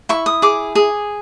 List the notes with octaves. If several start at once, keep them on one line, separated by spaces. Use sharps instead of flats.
E4 C#6
D#6
G#4 D6
G#4